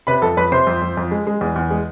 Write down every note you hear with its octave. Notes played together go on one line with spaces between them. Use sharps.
C3 B4 B5
F2 A4 A5
F2 B4 B5
C3 C5 C6
F2
F2
F2
G#3
G#3
E2
E2
G#3